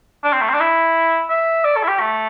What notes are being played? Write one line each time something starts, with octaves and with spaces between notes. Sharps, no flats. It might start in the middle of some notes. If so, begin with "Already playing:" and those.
D4
C4
A3
C4
D4
E4
E5
D5
A4
E4
G4
A3